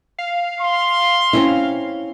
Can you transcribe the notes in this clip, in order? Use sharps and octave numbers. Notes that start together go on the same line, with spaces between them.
F5
C6
C4 C#4 E4